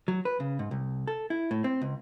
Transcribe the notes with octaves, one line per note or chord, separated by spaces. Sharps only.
F#3
B4
C#3
G#2
C2
A4
E4
A2
C4
C#2